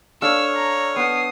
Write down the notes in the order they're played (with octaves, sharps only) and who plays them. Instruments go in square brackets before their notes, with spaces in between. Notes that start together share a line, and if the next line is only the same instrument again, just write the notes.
[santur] D4 A4 F5 [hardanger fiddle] C#5 [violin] E6
[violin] A#5
[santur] B3 F#5 [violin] D#6 C7